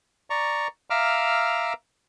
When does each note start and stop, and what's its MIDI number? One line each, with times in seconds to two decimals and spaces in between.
0.30 0.68 74
0.30 0.68 82
0.30 0.68 85
0.90 1.73 76
0.90 1.73 77
0.90 1.73 82
0.90 1.73 86
0.90 1.73 88
0.90 1.73 89